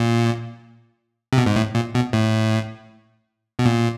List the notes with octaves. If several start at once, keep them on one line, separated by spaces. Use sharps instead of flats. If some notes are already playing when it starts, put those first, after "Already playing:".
Already playing: A#2
C3
B2
G#2
A2
A#2
B2
A2
B2
A#2